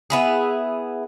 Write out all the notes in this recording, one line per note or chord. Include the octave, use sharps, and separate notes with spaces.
B3 E4 G#4